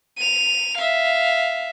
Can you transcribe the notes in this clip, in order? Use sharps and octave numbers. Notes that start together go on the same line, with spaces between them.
D#7 F7
E5 F5